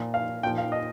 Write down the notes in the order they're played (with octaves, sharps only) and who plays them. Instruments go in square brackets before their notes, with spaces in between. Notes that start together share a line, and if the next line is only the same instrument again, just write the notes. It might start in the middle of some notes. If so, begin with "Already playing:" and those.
Already playing: [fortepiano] A#2 F3
F5
A#2 F3 G5
F5
D#5